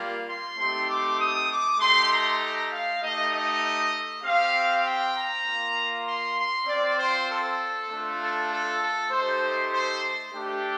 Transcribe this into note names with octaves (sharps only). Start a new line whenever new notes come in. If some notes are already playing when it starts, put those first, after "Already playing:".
Already playing: G3 A#3 F4
C6
A3 C4 D#4 G4 C6
D6
D#6
D6
A3 D#4 G4 C6
A#5
F5
A3 D#4 G4 D#5
D#5
C4 G4 F5
G5
A#5
A#3 F4
C6
C6
C4 F4 D5
C5
A4
A3 D4 F4
A4
A4
A4
A3 D#4 G4 C5
C5
A3 D4 G4